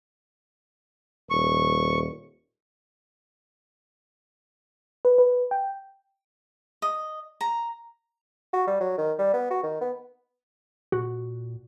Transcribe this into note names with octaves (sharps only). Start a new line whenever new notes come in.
D#1 C#6
B4
B4
G5
D#5
A#5
F#4
G3
F#3
D#3
G3
B3
F#4
D#3
B3
A#2 F#4